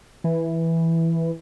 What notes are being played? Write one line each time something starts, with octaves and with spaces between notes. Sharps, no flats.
E3